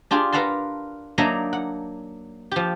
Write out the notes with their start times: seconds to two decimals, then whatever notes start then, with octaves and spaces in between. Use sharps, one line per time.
0.11 D4 F4 G4 G#4
0.32 A#4 B4 F5 F#5 A5 C6
1.18 F#3 A#3 D4 D#4 D#5 E5
1.53 F#5
2.51 F3 G4